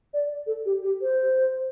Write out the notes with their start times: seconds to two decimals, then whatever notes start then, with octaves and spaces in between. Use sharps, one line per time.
0.13 D5
0.46 A4
0.65 G4
0.83 G4
1.02 C5